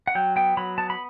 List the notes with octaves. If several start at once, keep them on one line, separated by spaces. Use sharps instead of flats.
F#5
F#3 G5
B3 G5
F#3 B5
B3 A5
B5